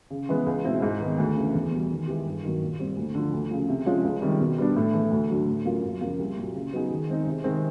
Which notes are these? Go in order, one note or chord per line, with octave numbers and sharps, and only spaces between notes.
C#3
E3 G#3 B3
C#2
B2 G#3 C4 E4
G#2
D#3 G#3 B3
D2
C#3 E3
E2
B2 G3
D#3
G#3 B3 E4 G4
G2
D#3 F#3 A#3
A#2
G3 C4
D2
D3 F3
D2
C#3 F3
C3
F3 G#3 C#4 F4
C#2
C3 D#3 G3
B2
G3 B3 D4
A2
E3 A3
D2
D3 F#3
A2
F#3 A#3 C#4 F4
F#2
C#3 F3 A#3
C2
A#2 F#3
C#3
F#3 B3 D#4 G#4
D#3
G#3 C4 D#4
C3
D#3 G#3 C4